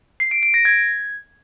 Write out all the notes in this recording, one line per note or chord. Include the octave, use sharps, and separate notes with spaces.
C7
D7
D7
A#6
G#6